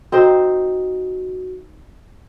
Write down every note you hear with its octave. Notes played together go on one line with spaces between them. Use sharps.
C4 D#4 F#4 C5